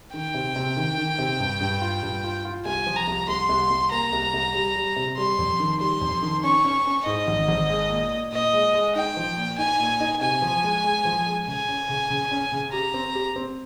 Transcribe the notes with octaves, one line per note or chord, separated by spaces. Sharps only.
D#3 G5
C3
C3
D#3
D#3
C3
G2
G2
F4
G2
F4
F4
C2 G#5
F3
A#5
C2
C2 C6
C2
C2
A#3 A#5
C2
C2
G3
G3
C3
G3 C6
F2
D#3
G3 C6
F2
D#3
C#4 C#6
C#4
C#4
G#2 D#5
G#1
G#1
G#3
A#2
A#2
A#2 D#5
G#3
G#3
D#4 G5
F3
A#2
D#4 G#5
A#2
D#4
C3 G#5
F3
G#3
G#3
F3
G#3
C#3 G#5
C#4
C#3
C#3
C#4
C#3
G4 A#5
C4
G4
C4